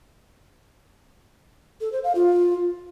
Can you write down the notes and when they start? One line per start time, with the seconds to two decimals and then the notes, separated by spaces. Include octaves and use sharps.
1.81 A4
1.92 C5
2.04 F5
2.15 F4